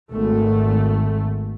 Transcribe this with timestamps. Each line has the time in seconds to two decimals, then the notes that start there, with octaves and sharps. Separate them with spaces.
0.12 G#1 A3